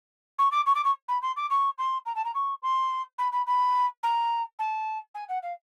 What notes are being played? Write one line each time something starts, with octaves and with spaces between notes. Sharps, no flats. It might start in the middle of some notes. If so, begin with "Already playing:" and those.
C#6
D6
C#6
D6
C#6
B5
C6
D6
C#6
C6
A#5
A5
A#5
C#6
C6
B5
B5
B5
A#5
A5
G#5
F#5
F5